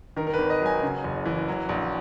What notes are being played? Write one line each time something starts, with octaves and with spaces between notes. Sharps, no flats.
D#3 A#4
A#4
G#1 B4
D#5
F#3
G#5
C#3
F#1
E3
F#3
A#1